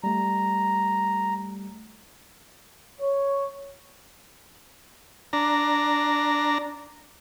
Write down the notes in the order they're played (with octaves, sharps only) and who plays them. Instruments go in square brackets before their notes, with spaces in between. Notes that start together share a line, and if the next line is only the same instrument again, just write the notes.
[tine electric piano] G3 A3 [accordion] A#5
[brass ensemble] C#5
[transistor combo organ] D4 A#5